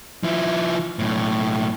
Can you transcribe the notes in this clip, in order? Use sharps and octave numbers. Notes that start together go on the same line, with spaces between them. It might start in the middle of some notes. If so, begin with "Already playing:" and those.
F3 E4
B1 A2